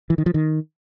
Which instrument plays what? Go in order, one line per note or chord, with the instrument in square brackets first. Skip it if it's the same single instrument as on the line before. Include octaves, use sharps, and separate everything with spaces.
[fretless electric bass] E3
D#3
F3
D#3